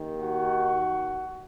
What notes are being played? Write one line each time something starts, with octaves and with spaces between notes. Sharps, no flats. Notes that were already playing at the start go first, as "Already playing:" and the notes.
Already playing: D#2 D#3
F#4